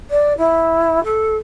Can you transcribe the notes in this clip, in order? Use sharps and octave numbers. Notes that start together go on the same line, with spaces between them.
D5
E4
A4